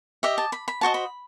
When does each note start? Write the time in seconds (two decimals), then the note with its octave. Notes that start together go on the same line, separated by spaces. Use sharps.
0.23 G4 D#5 E5
0.38 A5
0.52 B5
0.68 B5
0.81 F#4 C5 D#5 A5
0.94 B5